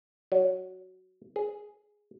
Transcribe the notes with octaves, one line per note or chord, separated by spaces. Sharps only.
F#3
G#4